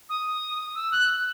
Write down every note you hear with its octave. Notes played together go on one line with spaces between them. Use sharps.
D#6
E6
F#6